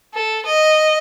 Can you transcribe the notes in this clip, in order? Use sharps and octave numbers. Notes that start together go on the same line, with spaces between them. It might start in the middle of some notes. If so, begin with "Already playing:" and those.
A4
D#5